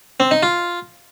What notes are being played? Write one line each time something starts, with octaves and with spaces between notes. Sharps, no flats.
C4
D#4
F4